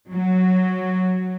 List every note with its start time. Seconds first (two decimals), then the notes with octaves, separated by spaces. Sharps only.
0.11 F#3